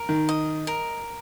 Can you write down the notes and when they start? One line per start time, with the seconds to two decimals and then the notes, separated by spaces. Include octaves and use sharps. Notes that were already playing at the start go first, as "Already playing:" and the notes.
Already playing: A#4
0.09 D#3
0.29 D#5
0.67 A#4